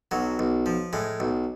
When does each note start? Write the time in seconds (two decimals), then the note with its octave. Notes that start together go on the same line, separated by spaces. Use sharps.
0.11 B1 F#3
0.39 B1
0.66 F3
0.93 A2 G#3
1.20 B1